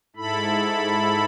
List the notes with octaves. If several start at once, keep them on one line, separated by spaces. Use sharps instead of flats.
G#2 E4 A4 B5